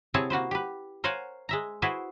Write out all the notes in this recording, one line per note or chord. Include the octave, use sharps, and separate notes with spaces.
C3 C4 E4 G#4 C#5 A5
A#3 F#4 B4 C5
G4 B4
A#4 C5 C#5 F5 F#5 G#5
G#3 E5 A#5
E4 F#4 G#4 B4 C5 E5